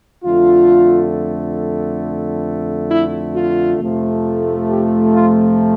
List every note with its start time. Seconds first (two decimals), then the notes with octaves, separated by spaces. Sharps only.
0.24 F2 D3 A3 F4
2.90 E4
3.35 F4
3.80 F2 C3 F3 A3
4.68 G4
5.13 F4